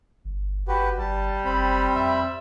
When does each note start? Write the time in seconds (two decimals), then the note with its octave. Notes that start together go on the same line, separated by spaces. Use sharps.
0.25 G1
0.68 G1 F#4 G4 B4
0.99 G1 G3 A5
1.45 F#1 C4 B5
1.96 F2 E5